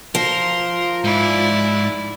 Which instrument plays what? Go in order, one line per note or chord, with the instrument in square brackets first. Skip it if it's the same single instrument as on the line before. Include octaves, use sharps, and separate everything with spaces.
[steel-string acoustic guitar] F3 [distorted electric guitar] A#4 [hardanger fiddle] C6
[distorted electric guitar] G#2 [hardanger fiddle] E4 D5